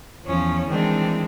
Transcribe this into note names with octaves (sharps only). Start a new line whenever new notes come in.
E2 F3 C#4
D#3 E3 G3 G#3 C4 D4